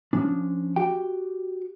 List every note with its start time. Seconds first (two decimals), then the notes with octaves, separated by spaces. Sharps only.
0.13 F3 C#4 D4
0.76 F#4 G4 G5